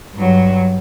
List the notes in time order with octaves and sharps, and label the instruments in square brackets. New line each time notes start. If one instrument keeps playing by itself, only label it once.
[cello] G2 F#3